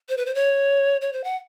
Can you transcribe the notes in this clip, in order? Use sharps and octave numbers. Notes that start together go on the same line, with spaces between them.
C5
B4
C5
C#5
C#5
C5
F#5